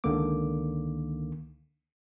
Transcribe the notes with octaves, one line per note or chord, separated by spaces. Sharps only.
C#2 D3 D#3 A#3 D6